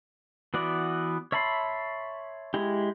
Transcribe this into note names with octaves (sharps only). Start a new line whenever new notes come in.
E3 B3 F#4 D5
C#5 E5 A5 B5 C6
G#3 E4 G4